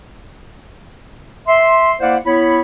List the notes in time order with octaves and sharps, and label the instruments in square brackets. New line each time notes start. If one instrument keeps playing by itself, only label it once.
[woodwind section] E5 C6
A#3 E4 C5 D5 F5 F#5
B3 E4 C#5 B5